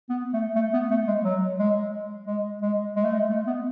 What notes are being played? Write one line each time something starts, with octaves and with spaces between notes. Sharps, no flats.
B3
A3
A3
B3
A3
G#3
F#3
G#3
G#3
G#3
G#3
A3
G#3
A3
B3